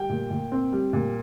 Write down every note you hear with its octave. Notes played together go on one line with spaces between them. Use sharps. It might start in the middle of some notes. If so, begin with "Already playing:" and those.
Already playing: G3 G5
A#2
A#2
C4
G3
A#2